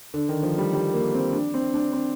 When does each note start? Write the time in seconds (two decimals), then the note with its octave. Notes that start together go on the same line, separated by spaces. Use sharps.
0.14 D3
0.29 D#3
0.43 F3
0.58 G3
0.73 G3
0.94 A#3
1.14 C4
1.33 D4
1.54 C4
1.74 D4
1.93 C4